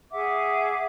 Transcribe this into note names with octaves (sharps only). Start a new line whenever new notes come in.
G#4 E5 F#5 D6